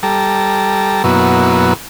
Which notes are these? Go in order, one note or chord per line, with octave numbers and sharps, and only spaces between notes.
G3 A4 A#5
F#2 B2 F#3 A#3 B3 E4